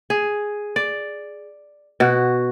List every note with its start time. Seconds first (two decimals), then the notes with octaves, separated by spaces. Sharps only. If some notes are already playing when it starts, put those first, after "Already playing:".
0.10 G#4
0.76 D5
2.00 B2 F#4